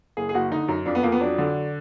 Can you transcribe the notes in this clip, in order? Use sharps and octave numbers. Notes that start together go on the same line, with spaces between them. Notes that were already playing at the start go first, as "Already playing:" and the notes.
F#1 G#4
G#4
F#1 F#4
D3 D#4
F#2
F2 D4
B3
F2 A#3
B3
F#3 D4
D3